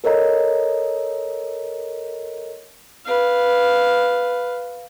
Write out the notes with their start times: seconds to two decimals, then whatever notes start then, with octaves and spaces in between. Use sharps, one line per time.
0.04 A4 A#4 C#5 D#5 A#5
3.05 B4 F5